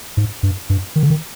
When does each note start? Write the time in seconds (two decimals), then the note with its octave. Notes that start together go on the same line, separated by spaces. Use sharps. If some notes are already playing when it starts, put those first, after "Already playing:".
0.17 G#2
0.43 G2
0.70 G2
0.96 D#3
1.03 D3
1.10 D#3